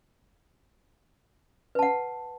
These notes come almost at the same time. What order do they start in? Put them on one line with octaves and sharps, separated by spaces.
B4 A5 F#5